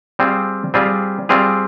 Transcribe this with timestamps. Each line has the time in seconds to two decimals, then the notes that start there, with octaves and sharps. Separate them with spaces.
0.19 G3 C4 F4 G#4
0.74 G3 C4 F4 G#4
1.29 G3 C4 F4 G#4